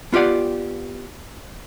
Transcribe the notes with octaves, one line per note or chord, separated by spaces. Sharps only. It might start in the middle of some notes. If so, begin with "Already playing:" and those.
B3 F4 G4 D5 F#5